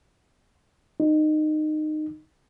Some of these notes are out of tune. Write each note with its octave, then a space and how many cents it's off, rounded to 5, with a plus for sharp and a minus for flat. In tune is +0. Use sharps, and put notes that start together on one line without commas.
D#4 -20